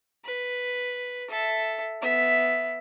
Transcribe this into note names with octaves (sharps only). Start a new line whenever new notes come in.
B4
A4 E5
B3 E5